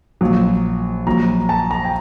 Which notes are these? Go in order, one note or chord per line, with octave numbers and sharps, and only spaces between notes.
A#1 A#2 F#3
A#1 A#2 F#3 A#5
A5
A#5
G5